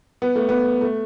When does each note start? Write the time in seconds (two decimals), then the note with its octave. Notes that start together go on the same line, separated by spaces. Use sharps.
0.22 B3
0.35 A3
0.49 B3
0.81 A3